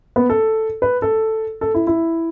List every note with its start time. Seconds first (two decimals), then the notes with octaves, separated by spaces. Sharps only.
0.16 B3
0.30 A4
0.82 B4
1.02 A4
1.61 A4
1.74 E4
1.87 E4